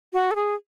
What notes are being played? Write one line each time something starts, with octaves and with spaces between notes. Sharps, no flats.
F#4
A4
G#4